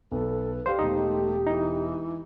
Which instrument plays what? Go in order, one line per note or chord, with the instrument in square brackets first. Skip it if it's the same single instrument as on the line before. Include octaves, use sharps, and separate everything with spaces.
[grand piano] B1 [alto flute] A4 [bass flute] B4
[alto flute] G4 [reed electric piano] C5 [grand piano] D5 F5 C6
[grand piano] E1 D#5 D#6 [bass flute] A3 [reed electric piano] D#4
[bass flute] E3 [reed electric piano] D#4